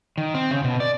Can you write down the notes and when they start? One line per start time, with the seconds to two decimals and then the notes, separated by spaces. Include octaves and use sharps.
0.18 D#3
0.34 C4
0.51 C#3
0.64 B2
0.80 D5